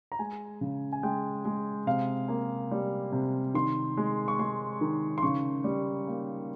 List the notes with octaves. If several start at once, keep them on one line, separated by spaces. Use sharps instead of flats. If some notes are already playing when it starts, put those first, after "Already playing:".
A#5
G#3 G#5
C#3
G#5
G#3 G5
G#3
C3 F5
A#3
G3
C3
D#3 C6
G#3
C#6
G#3 C6
D#3
C6
C#3 C#6
G3
A#3